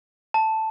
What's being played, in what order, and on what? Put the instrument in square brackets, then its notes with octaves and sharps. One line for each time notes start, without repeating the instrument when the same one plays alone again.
[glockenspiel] A5